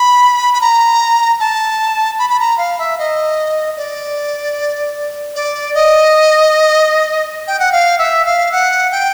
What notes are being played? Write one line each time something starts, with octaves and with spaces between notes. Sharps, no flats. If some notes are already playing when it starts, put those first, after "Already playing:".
Already playing: B5
B5
A#5
A5
B5
B5
A#5
F5
E5
D#5
D5
D5
D#5
G5
F#5
F5
E5
F5
F#5
G5